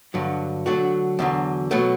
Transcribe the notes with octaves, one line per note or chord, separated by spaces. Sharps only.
G2 D3 F#3
D3 F#3 A3 D4 F#4
E2 D3 F#3
B2 F#3 A3